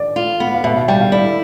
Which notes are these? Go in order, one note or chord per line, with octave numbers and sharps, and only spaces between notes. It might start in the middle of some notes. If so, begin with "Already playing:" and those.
Already playing: D5
F4
B3
F5
B2 E5
F5
G3 G5
F5
E4 D5